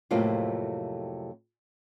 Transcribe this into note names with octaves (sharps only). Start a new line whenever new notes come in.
F2 A2 C3 F#3 A#3 F4